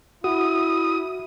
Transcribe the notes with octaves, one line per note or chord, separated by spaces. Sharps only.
E4 F#4 D#6